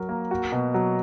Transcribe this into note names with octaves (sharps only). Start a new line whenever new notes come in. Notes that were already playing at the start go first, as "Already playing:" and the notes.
Already playing: F#3 A#4
A#3
F#4
B2
F#3